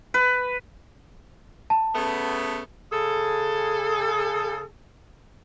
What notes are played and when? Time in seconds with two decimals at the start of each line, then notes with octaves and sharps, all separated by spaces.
0.14 B4
1.70 A5
1.94 C#3 A3 B3
2.91 C#3 G#4 A4